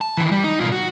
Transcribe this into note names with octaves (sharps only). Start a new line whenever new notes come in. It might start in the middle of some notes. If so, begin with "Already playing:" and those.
A5
D#3 E3
G3
D#4
B2 F4
F#4